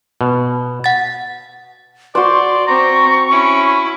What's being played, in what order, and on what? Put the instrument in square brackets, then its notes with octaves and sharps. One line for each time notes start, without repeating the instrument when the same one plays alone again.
[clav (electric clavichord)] B2
[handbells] F#5 A6
[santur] F#4 C5 [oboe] D5 [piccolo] C6
[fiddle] C4 [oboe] A#5 [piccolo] C#6
[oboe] C#4 [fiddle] E4